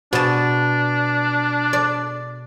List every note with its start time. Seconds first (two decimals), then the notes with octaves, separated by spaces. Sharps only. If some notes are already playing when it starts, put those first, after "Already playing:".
0.13 B2 D4 A5
1.73 D5